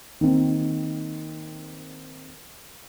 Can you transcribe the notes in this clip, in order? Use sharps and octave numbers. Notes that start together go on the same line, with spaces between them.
D#3 A#3 C4